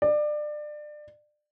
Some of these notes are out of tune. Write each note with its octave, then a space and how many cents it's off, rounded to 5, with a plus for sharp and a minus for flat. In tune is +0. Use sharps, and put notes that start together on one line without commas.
D5 +25